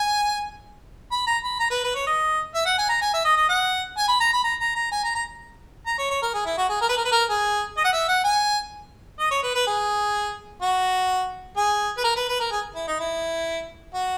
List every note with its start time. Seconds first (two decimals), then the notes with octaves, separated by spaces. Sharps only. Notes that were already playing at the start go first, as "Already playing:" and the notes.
Already playing: G#5
1.12 B5
1.27 A#5
1.44 B5
1.60 A#5
1.71 B4
1.84 B4
1.95 C#5
2.07 D#5
2.55 E5
2.66 F#5
2.78 G#5
2.89 A#5
3.01 G#5
3.14 E5
3.25 D#5
3.37 D#5
3.49 F#5
3.97 G#5
4.09 B5
4.21 A#5
4.33 B5
4.44 A#5
4.60 A#5
4.76 A#5
4.91 G#5
5.04 A#5
5.15 A#5
5.87 A#5
5.99 C#5
6.10 C#5
6.23 A#4
6.34 G#4
6.46 E4
6.58 F#4
6.70 G#4
6.82 A#4
6.89 B4
6.97 A#4
7.05 B4
7.12 A#4
7.30 G#4
7.77 D#5
7.85 F#5
7.93 E5
8.09 F#5
8.25 G#5
9.20 D#5
9.31 C#5
9.43 B4
9.55 B4
9.67 G#4
10.62 F#4
11.57 G#4
11.98 B4
12.04 A#4
12.16 B4
12.29 B4
12.40 A#4
12.51 G#4
12.75 E4
12.88 D#4
13.00 E4
13.94 F#4